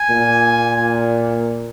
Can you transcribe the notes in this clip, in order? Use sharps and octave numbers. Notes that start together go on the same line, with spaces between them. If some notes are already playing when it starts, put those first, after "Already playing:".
Already playing: G#5
A#2